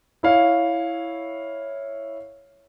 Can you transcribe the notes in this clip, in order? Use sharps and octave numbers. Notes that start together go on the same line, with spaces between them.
E4 C#5 F5